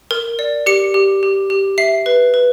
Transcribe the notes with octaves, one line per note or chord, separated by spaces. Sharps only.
A#4
D5
G4 C#7
G4
G4
G4
E5 C7
B4
B4